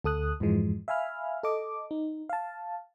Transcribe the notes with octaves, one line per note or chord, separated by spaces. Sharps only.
D2 A4 D#6 F#6
F2 G#2 E3 F3 G#3
E5 F5 G#5 B5 F6
A4 D#5 D6
D#4
F5 A5